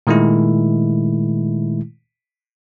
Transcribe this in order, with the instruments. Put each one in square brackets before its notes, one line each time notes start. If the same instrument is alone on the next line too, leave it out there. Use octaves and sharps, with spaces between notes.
[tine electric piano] A#2 D#3 G#3 A3 E4